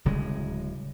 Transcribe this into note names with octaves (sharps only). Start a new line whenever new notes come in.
D1 C#3 G3 G#3